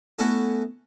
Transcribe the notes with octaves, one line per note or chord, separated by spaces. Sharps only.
A3 B3 C#4 E4 F#4 A4